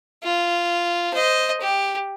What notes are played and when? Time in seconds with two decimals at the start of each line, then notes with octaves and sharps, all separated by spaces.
0.23 F4
1.14 C5 D#5
1.61 G4